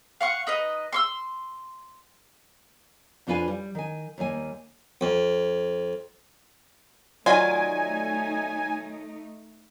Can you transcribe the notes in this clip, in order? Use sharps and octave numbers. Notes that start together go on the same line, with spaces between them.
F5 F#5 C#6
D#4 B4 D#5
C6 C#6 E6
F2 D4 F4 B4 F5 G#5
G3
D#3 G#5
D#2 G3 A#3 G#5
F2
D#3 F#3 A3 D#4 F4 D5 G#5